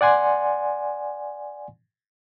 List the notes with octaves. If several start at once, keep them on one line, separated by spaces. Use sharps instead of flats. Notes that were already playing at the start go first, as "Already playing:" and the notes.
D5 F#5 G#5 C6